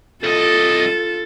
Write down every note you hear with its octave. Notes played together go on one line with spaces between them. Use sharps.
C2 F4 A4 D#5 A6